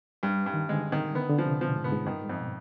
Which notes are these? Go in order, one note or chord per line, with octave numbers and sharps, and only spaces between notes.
G2 G3
G2
D#3
D3 G#3
D#3
D3 B3
D3
F3
C3
B2 F3
G#2
B3
G#2
G2 D#3
G#2
F2
B2